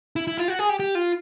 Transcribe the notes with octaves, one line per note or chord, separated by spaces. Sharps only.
E4
E4
F4
F#4
G#4
G4
G4
F4